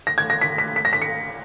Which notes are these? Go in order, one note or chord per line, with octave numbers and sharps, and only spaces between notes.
A#6
G#6
A#6
B6
B6
B6
A#6
B6
C#7